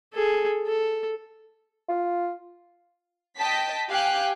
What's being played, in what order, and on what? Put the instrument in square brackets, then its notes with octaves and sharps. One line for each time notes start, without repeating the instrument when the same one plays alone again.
[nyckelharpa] G#4 A4
A4
[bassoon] F4
[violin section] D#5 G5 A5 B6
G4 F5 G5 G#5 F#6